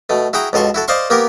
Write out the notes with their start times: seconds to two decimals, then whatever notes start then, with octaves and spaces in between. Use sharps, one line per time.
0.09 B2 A3
0.33 E4 F#4 G#4 G5 A#5
0.53 C#2 B2 A4 C6 C#6
0.74 E4 F#4 A4
0.88 C5 D5 D#5 F5 C6 C#6
1.10 A#3 B3 G4 A#4